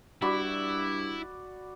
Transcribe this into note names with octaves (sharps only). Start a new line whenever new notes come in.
G2 E4 F#4 D5 B5